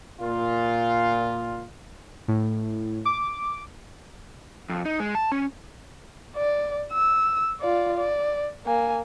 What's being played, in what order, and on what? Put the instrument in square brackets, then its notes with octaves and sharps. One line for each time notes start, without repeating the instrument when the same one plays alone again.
[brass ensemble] A#2 F4
[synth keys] A2
D6
[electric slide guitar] F2
D#4
G#3
A5
C#4
[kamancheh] D5
E6
F4 D5
D5
A#3 G#5